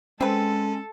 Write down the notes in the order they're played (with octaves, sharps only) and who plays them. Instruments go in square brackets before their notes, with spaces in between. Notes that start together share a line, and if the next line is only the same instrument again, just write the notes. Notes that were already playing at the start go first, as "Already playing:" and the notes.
[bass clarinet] G#3 [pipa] C4 B4 [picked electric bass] C#4 [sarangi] A4